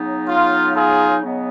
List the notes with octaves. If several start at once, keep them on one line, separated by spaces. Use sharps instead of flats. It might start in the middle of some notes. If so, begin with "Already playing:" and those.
Already playing: C#3 F#3 B3 D#4
F4
F4 G#4
C#3 F#3 B3 D#4